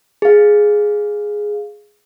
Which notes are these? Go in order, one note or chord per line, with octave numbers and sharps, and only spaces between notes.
G#4 F5